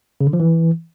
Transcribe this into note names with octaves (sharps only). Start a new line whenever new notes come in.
C#3
D3
F3
E3